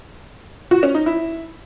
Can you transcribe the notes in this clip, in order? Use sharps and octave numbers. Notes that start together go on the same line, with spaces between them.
F#4
C#4
D#4
E4